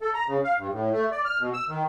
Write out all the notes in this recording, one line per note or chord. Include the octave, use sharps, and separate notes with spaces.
A4
A#5
C#3
F5
G2
A2
A3
D5
F6
B2
E6
D#3